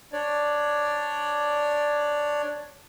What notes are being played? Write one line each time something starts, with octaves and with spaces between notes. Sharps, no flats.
D4 C#5 D5